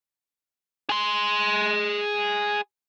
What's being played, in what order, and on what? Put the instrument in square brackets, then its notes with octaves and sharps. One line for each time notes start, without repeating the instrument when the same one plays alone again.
[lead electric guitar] G#4 C6